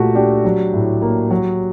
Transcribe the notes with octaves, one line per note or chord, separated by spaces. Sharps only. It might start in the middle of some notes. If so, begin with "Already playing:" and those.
Already playing: A#2 A3 F#4 G4
D4 G4
F#3
A2
A#3
F#3